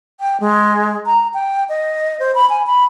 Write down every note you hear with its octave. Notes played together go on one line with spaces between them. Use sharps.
G5
G#3
A#5
G5
D#5
C5
B5
G#5
B5